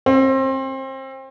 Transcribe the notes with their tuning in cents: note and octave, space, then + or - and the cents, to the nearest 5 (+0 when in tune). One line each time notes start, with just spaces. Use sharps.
C4 +30